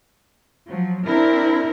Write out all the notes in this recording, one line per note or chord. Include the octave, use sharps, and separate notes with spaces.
F3 F#3
C4 D4 E4 A#4